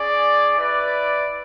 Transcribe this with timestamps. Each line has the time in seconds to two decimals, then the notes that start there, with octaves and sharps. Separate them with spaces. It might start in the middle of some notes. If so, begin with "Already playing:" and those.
Already playing: C#4 G#4 D5
0.57 E4 B4 D5